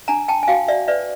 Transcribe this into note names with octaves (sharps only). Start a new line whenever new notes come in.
D4 G#5 A#5
G5 A5
G#5
F#4 F5 G5
D5 E5
B4 D5 E5